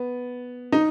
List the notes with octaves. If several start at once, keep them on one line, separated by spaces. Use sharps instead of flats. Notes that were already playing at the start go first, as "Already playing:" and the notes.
Already playing: B3
D#4